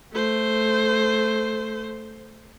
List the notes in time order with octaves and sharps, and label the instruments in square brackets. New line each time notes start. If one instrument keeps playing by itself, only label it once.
[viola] A3 C5